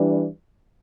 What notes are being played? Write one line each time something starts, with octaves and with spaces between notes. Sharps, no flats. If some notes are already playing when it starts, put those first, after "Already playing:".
Already playing: E3 G3 D4